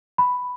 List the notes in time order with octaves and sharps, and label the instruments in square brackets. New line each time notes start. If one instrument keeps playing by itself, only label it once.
[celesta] B5